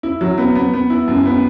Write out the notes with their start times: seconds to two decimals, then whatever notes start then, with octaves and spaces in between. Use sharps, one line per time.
0.03 E4
0.21 F#3
0.38 B3
0.55 B3
0.73 B3
0.90 E4
1.08 F#2
1.26 B3